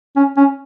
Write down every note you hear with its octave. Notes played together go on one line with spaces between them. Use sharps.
C#4
C#4